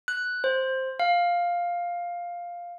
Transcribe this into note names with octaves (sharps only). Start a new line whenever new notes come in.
F#6
C5
F5